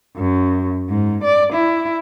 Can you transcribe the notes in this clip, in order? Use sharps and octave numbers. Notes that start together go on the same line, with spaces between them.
F#2
G#2
D5
E4